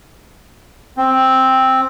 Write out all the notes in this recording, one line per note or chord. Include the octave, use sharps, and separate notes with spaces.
C4